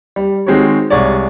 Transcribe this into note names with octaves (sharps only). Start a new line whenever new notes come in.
G3
D#3 G#3 C4 F#4 C5 C#5
C2 G#3 C#5 D5